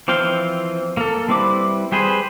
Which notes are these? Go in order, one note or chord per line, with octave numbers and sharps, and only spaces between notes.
E3 F3 C4 F5 G5
A#3 A4
G3 C4 E4 B4 D6
G3 G4 G#4 B4 C5